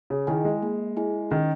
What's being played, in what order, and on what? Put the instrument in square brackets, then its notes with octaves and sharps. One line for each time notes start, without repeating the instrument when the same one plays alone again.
[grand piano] C#3
[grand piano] D#3 [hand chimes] E4 G#4 D#5 G#5
[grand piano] G#3
[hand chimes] A#3
E4 G#4 D#5 G#5
[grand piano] D#3 [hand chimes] C#4